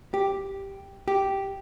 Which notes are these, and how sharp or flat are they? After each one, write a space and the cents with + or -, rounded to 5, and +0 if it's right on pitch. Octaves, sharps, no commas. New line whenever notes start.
G4 +0
G4 -5